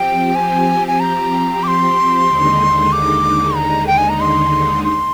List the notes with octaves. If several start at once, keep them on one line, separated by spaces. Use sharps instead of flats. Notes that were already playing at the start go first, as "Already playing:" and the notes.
Already playing: F3 C4 G4 G5
G#5
G#5
A#5
D6
C6
D#2 D3 G#3 D#4
D6
A#5
G5
G#5
A#5
C6
C6